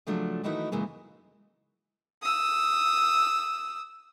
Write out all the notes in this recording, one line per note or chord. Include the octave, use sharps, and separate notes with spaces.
C#3 F3 F#3 A3 D4
D#3 E3 A3 D#4 E4 F#4
F#2 C#3 E3 G#3 A#3
D#6 E6